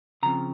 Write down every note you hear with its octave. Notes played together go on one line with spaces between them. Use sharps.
C#3 F3 C4 A#5